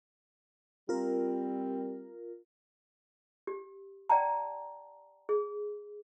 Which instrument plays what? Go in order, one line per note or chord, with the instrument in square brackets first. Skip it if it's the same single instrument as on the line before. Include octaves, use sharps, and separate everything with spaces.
[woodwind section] G3 C4 [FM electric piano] F4 A#4
[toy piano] G4
D5 F#5 G5 A5 A#5
G#4